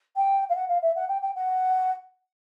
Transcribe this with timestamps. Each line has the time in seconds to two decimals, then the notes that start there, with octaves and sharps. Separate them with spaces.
0.16 G5
0.49 F5
0.55 F#5
0.68 F5
0.82 E5
0.95 F#5
1.08 G5
1.22 G5
1.35 F#5